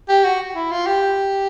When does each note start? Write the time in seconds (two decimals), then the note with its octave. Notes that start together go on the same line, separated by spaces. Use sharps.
0.09 G4
0.24 F#4
0.55 E4
0.71 F4
0.87 G4